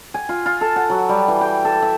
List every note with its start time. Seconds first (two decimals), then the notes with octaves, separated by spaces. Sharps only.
0.14 G#5
0.29 F4
0.46 F4
0.61 A4
0.76 F#5
0.90 F#3
1.09 G3
1.28 E3
1.41 G5
1.65 A4
1.82 E5